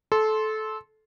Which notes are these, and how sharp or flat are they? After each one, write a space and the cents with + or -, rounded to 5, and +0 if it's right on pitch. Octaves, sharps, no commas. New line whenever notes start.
A4 -20 C6 +5